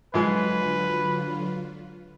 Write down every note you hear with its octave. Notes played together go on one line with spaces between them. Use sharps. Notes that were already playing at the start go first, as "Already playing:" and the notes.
G#2 D3 F3 F#3 G#3 F4 B4